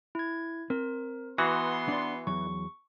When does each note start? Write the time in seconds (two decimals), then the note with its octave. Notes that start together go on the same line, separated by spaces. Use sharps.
0.15 E4 G#6
0.70 C4 A#4
1.38 E3 B3 F#4 C6 D#6
1.88 D4 D5
2.27 E2 F#3 C#6